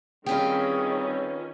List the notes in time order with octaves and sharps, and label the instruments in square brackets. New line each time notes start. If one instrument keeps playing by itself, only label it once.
[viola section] D#3 C#4 [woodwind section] G3 C4 [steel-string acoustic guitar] F4 B4 G5 [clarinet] G#4